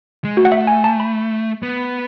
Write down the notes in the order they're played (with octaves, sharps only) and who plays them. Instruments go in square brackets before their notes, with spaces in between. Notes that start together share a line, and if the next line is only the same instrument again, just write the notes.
[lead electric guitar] G#3
[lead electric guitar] A3 [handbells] F#4
[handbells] F#5
E5
G#5
A5
B5
[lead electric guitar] B3